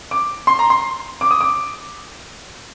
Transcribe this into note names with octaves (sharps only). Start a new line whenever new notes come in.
D6
C6
A#5
C6
D6
D#6
D6